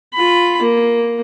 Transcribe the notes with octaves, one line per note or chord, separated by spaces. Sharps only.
F4 B5
A#3